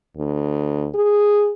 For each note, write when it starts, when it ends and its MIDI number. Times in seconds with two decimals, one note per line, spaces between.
0.17 0.88 38
0.95 1.52 68